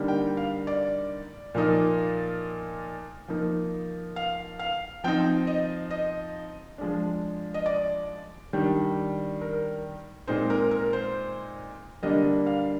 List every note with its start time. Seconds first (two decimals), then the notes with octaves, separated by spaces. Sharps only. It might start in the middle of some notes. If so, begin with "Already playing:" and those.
Already playing: D3 G3 A#3 D#4
0.08 G5
0.37 F5
0.67 D5
1.55 A#2 F3 A#3 D#4
3.28 F3 A#3 D#4
4.16 F5
4.59 F5
5.04 F3 C4 D#4 G5
5.47 D#5
5.91 D#5
6.78 F3 G#3 D4
7.54 D#5
7.66 D5
8.53 D#3 G3 D4
9.41 A#4
10.27 A#2 G#3 C4 D#4 C5
10.50 A#4
10.71 A#4
10.93 C5
12.03 D3 G3 A#3 D4 D#5
12.46 F5